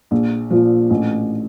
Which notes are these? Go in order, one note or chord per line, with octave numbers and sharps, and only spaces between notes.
A#1
A#2 F3
A1